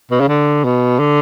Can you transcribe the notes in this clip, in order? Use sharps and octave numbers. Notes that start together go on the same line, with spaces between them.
B2
C#3
D3
B2
D3